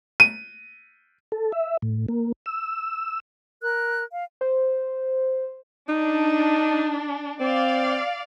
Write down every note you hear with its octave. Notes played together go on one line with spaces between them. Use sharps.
D#7
A4
E5
A2
A#3
E6
A#4 F#6
F5
C5
D4 D#4
C4 D5 F5